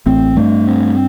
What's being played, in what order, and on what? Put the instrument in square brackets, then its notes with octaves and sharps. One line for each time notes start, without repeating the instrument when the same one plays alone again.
[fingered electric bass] A1 A2 [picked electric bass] C4
[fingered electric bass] G2 [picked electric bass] A3
[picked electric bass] C4